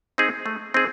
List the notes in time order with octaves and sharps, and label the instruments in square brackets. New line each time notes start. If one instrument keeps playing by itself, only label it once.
[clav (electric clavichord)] C4 D#4 G#4
A3
C4 D#4 G#4